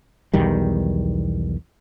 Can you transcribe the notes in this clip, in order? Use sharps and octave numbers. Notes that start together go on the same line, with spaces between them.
B1 E2 D#3 G3